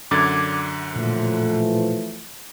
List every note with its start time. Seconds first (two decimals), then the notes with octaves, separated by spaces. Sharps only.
0.11 F#2 D3 D6 G#6 A6
0.96 A#2 E3 F3 A3